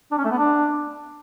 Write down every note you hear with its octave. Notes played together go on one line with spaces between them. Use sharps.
D4
C#4
A3
B3
D4